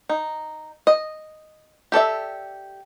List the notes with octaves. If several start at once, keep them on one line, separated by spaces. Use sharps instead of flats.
D#4
D#5
G4 A4 D5 E5